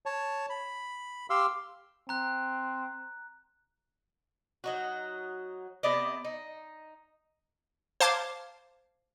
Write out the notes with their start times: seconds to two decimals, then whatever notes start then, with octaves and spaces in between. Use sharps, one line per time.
0.06 C#5 A5
0.50 B5
1.30 G4 F5 C6 E6
2.09 C4 A#5 F#6
4.64 F#3 D#4 F#4
5.83 C3 B3 D5 D#5
6.24 D#4
8.00 C5 F5 A5 D6 G#6